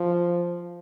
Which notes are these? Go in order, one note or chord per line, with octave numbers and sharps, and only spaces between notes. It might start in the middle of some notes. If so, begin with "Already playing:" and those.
Already playing: F3